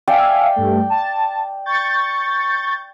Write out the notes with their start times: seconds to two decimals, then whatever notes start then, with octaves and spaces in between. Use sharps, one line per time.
0.08 D5 E5 F5 G5 G#5
0.56 G2 A3
0.90 A5
1.66 C#6 G6 A6